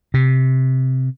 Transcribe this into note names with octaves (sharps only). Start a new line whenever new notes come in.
C3